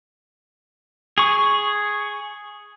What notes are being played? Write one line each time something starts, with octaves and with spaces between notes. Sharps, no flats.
G#4 C#6